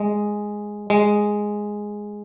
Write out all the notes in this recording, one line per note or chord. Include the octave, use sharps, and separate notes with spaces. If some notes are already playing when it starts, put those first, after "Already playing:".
Already playing: G#3
G#3